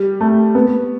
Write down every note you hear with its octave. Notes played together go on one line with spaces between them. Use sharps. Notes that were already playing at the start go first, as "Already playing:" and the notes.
Already playing: G3
A3
B3